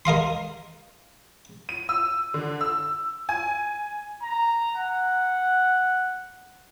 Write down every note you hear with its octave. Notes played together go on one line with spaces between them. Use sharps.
A#4 D#5 F5 C6
D#7
E6
D3
E6
G#5
A#5
F#5